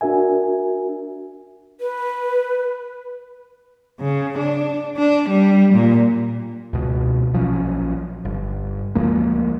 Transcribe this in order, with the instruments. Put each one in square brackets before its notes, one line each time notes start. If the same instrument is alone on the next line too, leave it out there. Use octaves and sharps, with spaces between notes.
[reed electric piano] D4 F#4 A#4 E5 G#5
[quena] B4
[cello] C#3
D4
D4
G3
A#2
[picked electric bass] C#2 B2
A#1 F3 F#3 C#4
G1
D2 F3 G#3 A#3